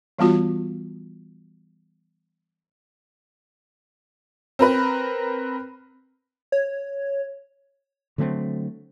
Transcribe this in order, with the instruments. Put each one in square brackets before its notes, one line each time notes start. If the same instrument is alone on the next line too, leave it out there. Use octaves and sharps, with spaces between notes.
[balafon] E3 G3 B3 F4 F#4
[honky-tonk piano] C4 A#4 B4
[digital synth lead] C#5
[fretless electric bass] D3 F#3 A3 C4